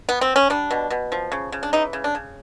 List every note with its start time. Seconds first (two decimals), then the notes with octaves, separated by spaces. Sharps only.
0.09 B3
0.21 C4
0.36 C#4
0.50 G3 D4
0.71 B2
0.90 B2
1.12 F3
1.32 C#3
1.52 C#3
1.63 D4
1.73 E3 D#4
1.93 C#3
2.04 D4
2.15 C#3